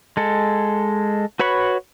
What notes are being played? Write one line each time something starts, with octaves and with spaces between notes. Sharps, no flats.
G#3 A4
F#4 B4 C#5 B5 C#6